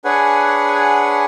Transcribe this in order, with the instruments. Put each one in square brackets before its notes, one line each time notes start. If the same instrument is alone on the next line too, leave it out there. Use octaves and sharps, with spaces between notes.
[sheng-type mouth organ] D4 G#4 B4 C#5 F#5 G#5